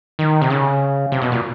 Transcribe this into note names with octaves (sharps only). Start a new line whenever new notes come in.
D#3
C3
C#3
C3
B2
A#2